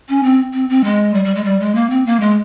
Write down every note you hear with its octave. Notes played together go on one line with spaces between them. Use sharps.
C#4
C4
C4
C4
G#3
G3
G3
G#3
G3
G#3
A#3
C4
A#3
G#3